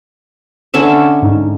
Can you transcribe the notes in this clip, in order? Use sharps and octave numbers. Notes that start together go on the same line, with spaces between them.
D3 C#4 E5
G#2 D#4